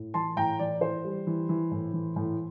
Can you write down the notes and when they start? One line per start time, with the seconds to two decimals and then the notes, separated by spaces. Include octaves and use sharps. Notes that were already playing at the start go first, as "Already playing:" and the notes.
Already playing: A2
0.14 E3 A5 C6
0.36 A2 G5 A#5
0.59 E3 D5
0.81 E3 C5
1.04 G3
1.27 E3
1.49 E3
1.71 A2
1.93 E3
2.16 A2